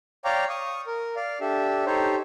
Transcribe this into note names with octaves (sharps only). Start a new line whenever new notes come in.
C#5 D5 F5 G5 A#5 D6
C#6 D#6
A#4
D5 F5
D4 G4 A4 E5
D#4 G4 A4 C5 C#5